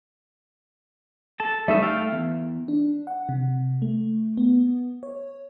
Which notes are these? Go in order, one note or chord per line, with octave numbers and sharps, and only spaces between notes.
A4 A5
G3 A3 D#4 E5
A4 F5 G5
E2
D4
F#5
C3
A3
B3
C#5